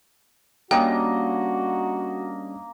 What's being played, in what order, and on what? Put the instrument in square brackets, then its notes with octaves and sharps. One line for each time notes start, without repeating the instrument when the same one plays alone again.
[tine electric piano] G3 C#4 D4 [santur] A#3 D#5 [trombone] F#4 [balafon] G5